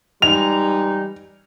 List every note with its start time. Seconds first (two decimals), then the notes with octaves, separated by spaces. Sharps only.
0.22 E3 G3 G#3 D#4 F7